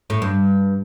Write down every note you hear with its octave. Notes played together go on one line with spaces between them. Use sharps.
A2
G2